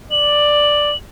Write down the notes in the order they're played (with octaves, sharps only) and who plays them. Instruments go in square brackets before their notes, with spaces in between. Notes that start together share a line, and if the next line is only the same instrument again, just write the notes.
[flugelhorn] D5 [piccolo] F#7